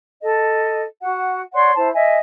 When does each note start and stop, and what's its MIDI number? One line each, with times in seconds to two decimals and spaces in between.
0.22 0.82 69
0.22 0.82 75
1.01 1.40 66
1.01 1.40 78
1.53 1.71 73
1.53 1.71 74
1.53 1.71 78
1.53 1.71 84
1.76 1.89 64
1.76 1.89 72
1.76 1.89 81
1.93 2.17 75
1.93 2.17 76
1.93 2.17 80